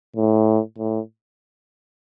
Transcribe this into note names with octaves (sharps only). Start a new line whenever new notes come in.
A2
A2